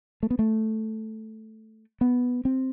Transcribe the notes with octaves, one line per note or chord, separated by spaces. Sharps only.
A3
B3
A3
B3
C4